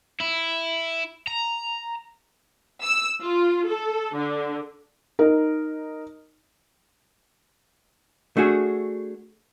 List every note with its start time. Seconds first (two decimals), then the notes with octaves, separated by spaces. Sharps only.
0.20 E4
1.27 A#5
2.83 E6
3.22 F4
3.69 A4
4.16 D3
5.19 D#4 A#4
8.37 A3 D4 F#4 G#4